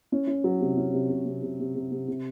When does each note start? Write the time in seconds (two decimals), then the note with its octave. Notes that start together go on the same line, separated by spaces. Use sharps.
0.12 C#4
0.27 C#4
0.44 F#3
0.61 C3
0.77 C#4
0.93 C3
1.10 C3
1.26 C3
1.42 C3
1.59 C3
1.75 C3
1.92 C3
2.08 C3